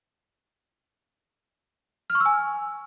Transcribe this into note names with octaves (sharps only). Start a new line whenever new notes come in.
F6
C#6
E6
G#5